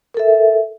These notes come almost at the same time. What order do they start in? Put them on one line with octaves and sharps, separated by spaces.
A#4 A4 E5